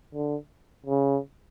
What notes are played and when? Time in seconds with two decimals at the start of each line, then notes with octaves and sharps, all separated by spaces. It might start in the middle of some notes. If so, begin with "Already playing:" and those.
0.14 D3
0.86 C#3